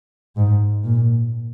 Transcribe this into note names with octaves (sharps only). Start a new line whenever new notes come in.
G#2
A#2